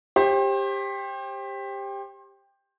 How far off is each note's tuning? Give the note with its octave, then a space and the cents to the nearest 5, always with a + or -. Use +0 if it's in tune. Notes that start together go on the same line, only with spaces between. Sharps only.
G4 +15 C5 +35